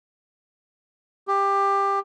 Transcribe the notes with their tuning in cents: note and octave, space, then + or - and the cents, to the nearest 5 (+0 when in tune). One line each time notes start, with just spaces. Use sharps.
G4 +15